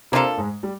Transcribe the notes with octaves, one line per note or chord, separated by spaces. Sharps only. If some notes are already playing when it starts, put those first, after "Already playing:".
C3 A#3 C4 D4 F4 A4
G#2 G#3
G3